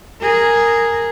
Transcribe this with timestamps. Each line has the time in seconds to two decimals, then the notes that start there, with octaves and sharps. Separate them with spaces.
0.21 G#4 A#4